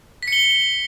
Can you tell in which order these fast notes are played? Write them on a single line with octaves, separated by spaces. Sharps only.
B6 C#7 G7